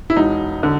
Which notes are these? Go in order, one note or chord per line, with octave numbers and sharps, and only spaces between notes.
E4
E1 D#4
D3